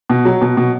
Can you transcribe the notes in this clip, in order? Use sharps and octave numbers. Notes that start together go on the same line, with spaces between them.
B2
F#3
B2
B2